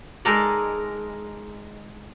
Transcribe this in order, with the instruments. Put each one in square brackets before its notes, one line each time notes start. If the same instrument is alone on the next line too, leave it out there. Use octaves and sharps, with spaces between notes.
[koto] G#3 D#4 A4 A#4 D5